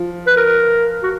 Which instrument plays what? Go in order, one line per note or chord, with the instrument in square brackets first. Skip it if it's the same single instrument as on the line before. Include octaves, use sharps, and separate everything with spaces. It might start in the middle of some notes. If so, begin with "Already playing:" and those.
Already playing: [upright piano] F3
[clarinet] B4
A#4
F#4